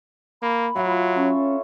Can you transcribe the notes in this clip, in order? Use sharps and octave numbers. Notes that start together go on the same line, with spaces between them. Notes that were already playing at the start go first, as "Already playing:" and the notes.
A#3 B5
F#3 E4 F4 F5
C#4 A4 C#5